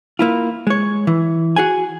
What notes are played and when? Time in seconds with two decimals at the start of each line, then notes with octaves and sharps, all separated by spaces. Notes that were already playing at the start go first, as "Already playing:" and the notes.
0.19 A#3 E4 F4
0.67 G#3 C#5
1.07 E3
1.56 F#4 G#4 F#5 G#5